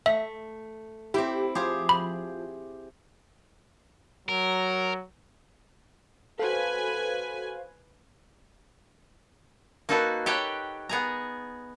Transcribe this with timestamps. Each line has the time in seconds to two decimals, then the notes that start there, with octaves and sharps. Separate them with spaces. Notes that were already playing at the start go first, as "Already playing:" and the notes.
0.06 A3 E5
1.14 C4 E4 G4
1.55 F3 G4 G#4 C5
1.89 B5
4.29 F#3 A#4
6.39 F#4 A4 B4 C5 F5 G#5
9.89 A#3 D#4 F#4 A4 B4
10.26 G4 A4 B4 C#5 F#5 G5
10.89 B3 G#4 A#5